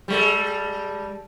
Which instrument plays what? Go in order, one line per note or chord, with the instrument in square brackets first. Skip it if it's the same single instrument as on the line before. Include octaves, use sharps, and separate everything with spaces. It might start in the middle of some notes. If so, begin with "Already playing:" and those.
[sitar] G3 G#3 A4